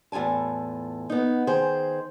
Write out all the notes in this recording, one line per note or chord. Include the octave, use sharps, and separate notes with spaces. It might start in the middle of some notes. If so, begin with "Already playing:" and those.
E2 A2 F4 G#5 A5
B3 D#4
D#3 G#4 C5